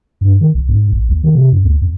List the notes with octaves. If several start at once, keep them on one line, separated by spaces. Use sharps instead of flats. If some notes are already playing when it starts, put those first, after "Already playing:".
G2
D#3
B1
G#2
A#1
D#2
D#3
C3
F#2
D2
F2